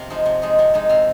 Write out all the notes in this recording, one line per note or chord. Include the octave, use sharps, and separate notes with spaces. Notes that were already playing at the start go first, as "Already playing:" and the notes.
Already playing: C3 F5
F3 G#3 D#4
C3
F3 G#3 D#4
C3
F3 G#3 D#4
C3 F5